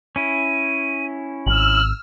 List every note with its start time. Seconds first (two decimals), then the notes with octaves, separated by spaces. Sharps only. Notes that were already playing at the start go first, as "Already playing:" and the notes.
0.16 C#4 E4 D#7
1.47 G#1 E6 F6 F#7